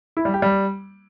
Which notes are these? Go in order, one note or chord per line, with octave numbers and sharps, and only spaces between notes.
E4
G3
G4
G3